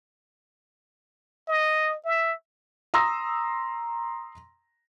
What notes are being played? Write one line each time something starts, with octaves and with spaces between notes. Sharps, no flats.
D#5
E5
A#5 C6 D#6 E6 A#6